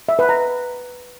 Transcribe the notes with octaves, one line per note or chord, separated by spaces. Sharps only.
E5
B4
A#5